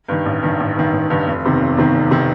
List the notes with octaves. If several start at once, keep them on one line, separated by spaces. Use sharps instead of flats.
G2 D#3
A1
G2 D#3
A1
G2 D#3
A1
G2 D#3
F1
E2 C3 D#3
F1
E2 C3 D#3
F1
C3 D#3